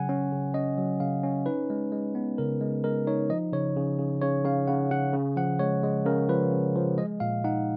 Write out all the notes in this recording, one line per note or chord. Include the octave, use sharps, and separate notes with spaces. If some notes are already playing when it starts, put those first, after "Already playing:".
Already playing: C#3 F#3 F#5 G#5
C#4
C#3
C#4 D#5
F#3
C#3 F5
C#4
D#4 B4
G#3
G#3
B3
C#3 A#4
G#3
G#3 A#4
D#4 C#5
F3 D#5
C#3 C#5
C#3
C#3
C#3 C#5
C#3 F5
C#3 F#5
C#3 F#5
C#3
F3 F#5
G#3 C#5
G#3
C#3 A#4
F3 B4
C#3
F3
G#3 D#5
A#2 F5
D#4 F#5